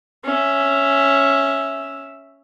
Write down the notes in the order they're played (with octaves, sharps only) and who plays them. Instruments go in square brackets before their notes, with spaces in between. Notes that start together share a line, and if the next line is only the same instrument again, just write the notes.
[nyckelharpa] C#4 E5